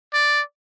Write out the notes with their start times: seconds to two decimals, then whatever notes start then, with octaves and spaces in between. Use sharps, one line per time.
0.14 D5